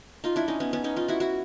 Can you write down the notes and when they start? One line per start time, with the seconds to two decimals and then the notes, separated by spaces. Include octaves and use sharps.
0.24 D#4 F4
0.36 D4 E4
0.48 C#4 D#4
0.60 B3 C#4
0.73 B3 C#4
0.84 C#4 D#4
0.96 D#4 F4
1.08 E4 F#4
1.20 E4 F#4